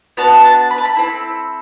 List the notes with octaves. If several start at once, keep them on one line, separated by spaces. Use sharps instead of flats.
B3 D4 F#4 A5
A5
B5
A5
B5
C4 E4 A4